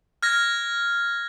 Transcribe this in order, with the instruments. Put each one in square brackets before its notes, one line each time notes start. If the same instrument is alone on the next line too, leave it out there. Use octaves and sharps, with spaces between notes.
[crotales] F6 G#6 A#6